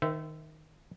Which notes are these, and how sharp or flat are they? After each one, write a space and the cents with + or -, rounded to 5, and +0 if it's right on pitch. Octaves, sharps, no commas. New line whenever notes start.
D#3 +0 C5 -30 E5 +0